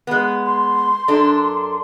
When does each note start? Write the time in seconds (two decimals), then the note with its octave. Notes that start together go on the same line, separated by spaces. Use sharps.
0.07 G#3 B3
0.46 C6
1.08 F#2 D4 A4